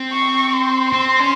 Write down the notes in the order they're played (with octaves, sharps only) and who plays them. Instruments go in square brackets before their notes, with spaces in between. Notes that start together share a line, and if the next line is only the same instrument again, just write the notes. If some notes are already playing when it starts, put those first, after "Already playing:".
Already playing: [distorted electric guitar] C4
[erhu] C#6
C6
[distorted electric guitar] C4
C#4